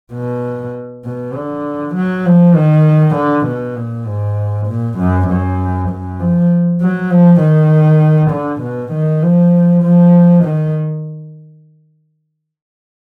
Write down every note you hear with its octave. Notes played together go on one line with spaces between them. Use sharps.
B2
B2
D3
F#3
F3
D#3
D3
B2
A#2
G#2
A#2
F#2
F#2
F#2
F3
F#3
F3
D#3
D3
B2
D#3
F3
F3
D#3